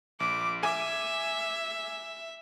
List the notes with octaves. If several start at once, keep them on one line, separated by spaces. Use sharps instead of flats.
A#1 D6
E5 G#5 D6